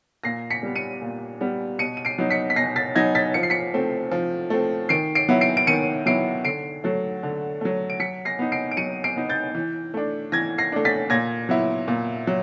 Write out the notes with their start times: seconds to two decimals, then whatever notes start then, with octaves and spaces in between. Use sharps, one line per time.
0.24 A#2 A#6 C7
0.50 B6 C#7
0.63 G3 B3
0.76 C#7 D#7
1.01 A#2
1.41 G3 B3
1.79 B2 C#7 D#7
1.97 D#7
2.05 C7 D7
2.18 F#3 B3 D#4
2.31 B6 C#7
2.50 B6
2.56 B2 A#6 C7
2.76 A6 B6
2.95 F#3 B3 D#4 G#6 A#6
3.15 A6 B6
3.34 F3 C#7
3.43 C7
3.50 B6 C#7
3.74 A3 C4
4.11 F3
4.50 A3 C4
4.89 D#3 C7 D7
5.15 C7 D7
5.29 F#3 B3 E4
5.41 C7 D7
5.57 D7
5.67 D#3 C#7 D#7
6.06 F#3 B3 E4 C7 D7
6.44 D3 C7 D7
6.84 F#3 A3
7.23 D3
7.61 F#3 A3
7.90 D7
8.00 F#3 B6 C#7
8.25 A#6 C7
8.39 B3 D#4
8.52 C7 D7
8.72 D7
8.77 F#3 C#7 D#7
9.04 C7 D7
9.16 B3 D#4
9.30 G6 A6
9.55 E3
9.94 A3 D4
10.32 E3 G#6 A#6
10.58 A#6 C7
10.72 A3 D4
10.85 A6 B6
11.10 A#2 G#6 A#6
11.49 F#3 B3 E4
11.88 A#2
12.27 F#3